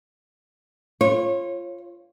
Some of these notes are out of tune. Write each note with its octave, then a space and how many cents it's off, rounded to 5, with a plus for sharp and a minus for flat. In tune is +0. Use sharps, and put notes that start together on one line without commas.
F4 -10 C#5 -30